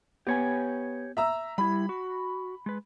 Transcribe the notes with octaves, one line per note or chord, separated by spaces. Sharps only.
B3 G4 C#5 G#5
E5 A#5 E6
G3 E4 B5
F#4
G#3 B4